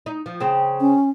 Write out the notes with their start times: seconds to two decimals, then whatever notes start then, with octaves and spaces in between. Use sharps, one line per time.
0.06 D#4
0.26 F3
0.40 C#3 C4
0.80 C#4